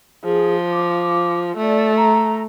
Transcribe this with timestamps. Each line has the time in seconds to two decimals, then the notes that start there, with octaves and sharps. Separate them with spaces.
0.24 F3 G#4
0.68 D6
1.58 A3 D5
1.96 A#5